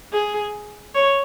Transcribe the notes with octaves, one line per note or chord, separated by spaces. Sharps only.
G#4
C#5